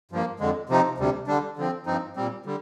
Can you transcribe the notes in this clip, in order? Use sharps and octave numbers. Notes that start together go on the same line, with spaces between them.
G2 F3 A#3
F2 D3 G#3
C3 F3 C4 D#4
D2 C3 G3
D3 G3 D4
D3 F3 C4
G2 F3 C4 D#4
A#2 G3 C4
D3 G3